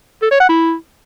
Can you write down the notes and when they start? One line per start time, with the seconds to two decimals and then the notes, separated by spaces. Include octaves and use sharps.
0.22 A4
0.31 C#5
0.40 F#5
0.49 E4